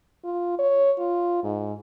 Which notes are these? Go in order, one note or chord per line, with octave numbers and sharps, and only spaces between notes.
F4
C#5
F4
G#2